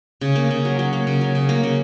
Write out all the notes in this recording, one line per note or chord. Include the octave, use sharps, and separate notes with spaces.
C#3
A#3
C#3
F#3
F#3
A#3
C#3
F#3
C#3
A#3
C#3